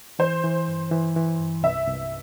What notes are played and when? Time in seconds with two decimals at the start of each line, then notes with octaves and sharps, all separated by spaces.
0.19 E3 C5
0.44 E3
0.68 G2
0.91 E3
1.16 E3
1.40 G2
1.63 C2 E5
1.88 C2